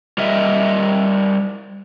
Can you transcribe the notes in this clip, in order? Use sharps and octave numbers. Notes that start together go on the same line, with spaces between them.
G3 G4 A#4 D#5 E5